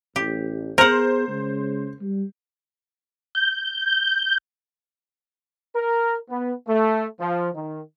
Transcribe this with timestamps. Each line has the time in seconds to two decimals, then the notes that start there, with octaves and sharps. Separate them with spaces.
0.16 A1 G4
0.78 B3 G#4 A#4 C5 F#5
1.28 C#3 G#3
2.01 G3
3.35 G6
5.76 A#4
6.30 B3
6.67 A3
7.19 F3
7.54 D#3